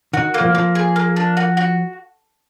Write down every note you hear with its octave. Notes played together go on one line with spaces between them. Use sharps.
D#3 F#4
A#3
F3
F3 A#3
G#4
A#3
D4
F#4
F#4